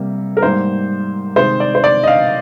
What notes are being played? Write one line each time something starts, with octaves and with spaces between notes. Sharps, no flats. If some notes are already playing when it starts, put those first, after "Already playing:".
Already playing: C3 G3 A#3
A#4
G#2 G3 A#3 C5
C3 D#3 G#3 C5
D5
C5
D5
D#5
F5